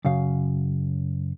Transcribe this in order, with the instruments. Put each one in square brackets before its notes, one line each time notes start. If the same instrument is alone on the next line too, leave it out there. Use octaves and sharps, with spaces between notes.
[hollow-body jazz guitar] F#2 C#3 F5